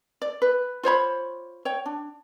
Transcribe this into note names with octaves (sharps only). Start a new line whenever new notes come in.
D5
B4
F4 C5 C#5 B5
C#5 G5
D4